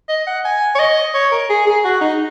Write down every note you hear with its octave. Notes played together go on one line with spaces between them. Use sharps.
D#5
F#5
G#5
C#5
D#5
C#5
A#4
G#4
G#4
F#4
D#4